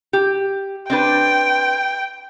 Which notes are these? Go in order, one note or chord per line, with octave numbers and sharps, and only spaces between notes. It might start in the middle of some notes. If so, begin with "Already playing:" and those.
G4
C4 D4 B4 G5